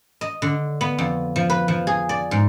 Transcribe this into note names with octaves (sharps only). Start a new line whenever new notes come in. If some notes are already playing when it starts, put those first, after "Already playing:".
D#5
D3
B3
F2
F3
B4
F3
G#4
D5
G#2